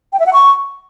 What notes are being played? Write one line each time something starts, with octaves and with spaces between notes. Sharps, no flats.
G5
E5
F#5
C#6